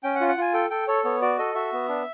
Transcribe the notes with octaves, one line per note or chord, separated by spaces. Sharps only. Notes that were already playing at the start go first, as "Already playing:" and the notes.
C#4 G5
F#5
F4
F#5
F4 G#5
A4 G5
A4 G5
A4 C#5
B3 C#5
F#4 D5
A4 D#5
F#4 E5
B3
D4